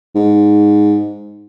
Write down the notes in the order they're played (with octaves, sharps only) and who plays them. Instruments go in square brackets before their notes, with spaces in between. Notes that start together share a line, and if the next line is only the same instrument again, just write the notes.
[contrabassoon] G#2